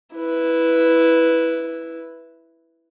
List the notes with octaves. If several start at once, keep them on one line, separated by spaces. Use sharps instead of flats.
E4 B4